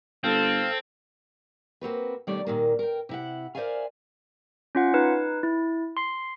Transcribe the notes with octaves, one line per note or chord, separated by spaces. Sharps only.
G1 C4 A4 F5
A#3 C4 F#4 B4
B2 D#3 G3 A3 C#5 D5
A#2 D#3 A#3
A#4 G5
C3 E4 F#5
A#4 C5 D5 E5 F5 G#5
C#4 F4 F#5
D#4 B4
E4
C6 C7